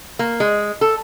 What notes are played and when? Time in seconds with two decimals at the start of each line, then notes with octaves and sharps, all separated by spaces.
0.19 A#3
0.40 G#3
0.81 A4